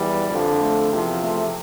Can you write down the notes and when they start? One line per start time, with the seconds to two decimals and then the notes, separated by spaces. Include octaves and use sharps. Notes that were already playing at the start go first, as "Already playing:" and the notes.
Already playing: E2 E3 G3
0.30 F2 D3 F3
0.61 A3
0.92 E2 C3 F3
1.23 A3